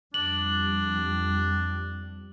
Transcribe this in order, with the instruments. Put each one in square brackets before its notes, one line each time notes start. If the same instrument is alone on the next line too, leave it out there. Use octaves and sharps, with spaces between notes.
[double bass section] F2 G3 [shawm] D4 [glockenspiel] F#7